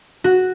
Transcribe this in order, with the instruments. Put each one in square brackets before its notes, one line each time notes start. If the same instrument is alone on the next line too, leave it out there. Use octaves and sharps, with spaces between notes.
[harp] F#4